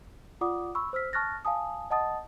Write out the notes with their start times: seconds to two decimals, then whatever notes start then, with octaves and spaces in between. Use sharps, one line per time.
0.41 F4 D5 F#5 D6 D#6
0.75 B5 C#6 E6
0.93 C5 E6 F6 B6
1.13 A5 C#6 F6 F#6 A6 A#6
1.45 F5 G#5 A5 D#6
1.90 D#5 F#5 A5 D#6 A6